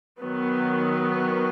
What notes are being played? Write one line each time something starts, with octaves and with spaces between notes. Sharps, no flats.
D#3 F#3 B3